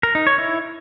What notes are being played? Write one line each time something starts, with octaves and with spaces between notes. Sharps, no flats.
A#4
D#4
C#5
E4